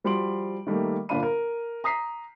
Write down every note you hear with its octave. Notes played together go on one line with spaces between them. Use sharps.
F3 G3 F#4 C6 D7 F#7
D#3 G3 A3 A#3
G1 A#2 D4 F5 B5 D#7
A#4
A#5 D#6 B6 C7